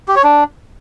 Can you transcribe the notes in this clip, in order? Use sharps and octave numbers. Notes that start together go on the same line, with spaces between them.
G4
C#5
D4